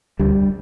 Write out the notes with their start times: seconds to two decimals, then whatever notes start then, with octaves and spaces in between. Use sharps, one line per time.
0.19 D2 D3 G3